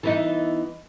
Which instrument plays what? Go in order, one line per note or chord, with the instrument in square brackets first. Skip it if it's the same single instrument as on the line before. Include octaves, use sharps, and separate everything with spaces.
[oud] E3 B3 D#4